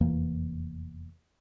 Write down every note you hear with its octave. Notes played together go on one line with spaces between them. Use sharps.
F1 E2 E3 A#3